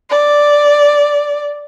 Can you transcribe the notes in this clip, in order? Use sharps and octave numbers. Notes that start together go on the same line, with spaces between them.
D5